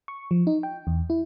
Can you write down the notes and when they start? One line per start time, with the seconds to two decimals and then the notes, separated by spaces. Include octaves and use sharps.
0.08 C#6
0.31 F3
0.47 D#4
0.63 G5
0.87 E2
1.10 E4